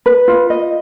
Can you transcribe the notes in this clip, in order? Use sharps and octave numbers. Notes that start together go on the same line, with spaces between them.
B4
F4
D#5